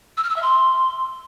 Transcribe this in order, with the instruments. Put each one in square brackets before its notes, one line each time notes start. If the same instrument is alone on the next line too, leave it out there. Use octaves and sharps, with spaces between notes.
[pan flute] E6
F6
E6
E5
C6